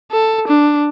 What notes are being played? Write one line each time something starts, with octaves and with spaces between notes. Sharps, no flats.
A4
D4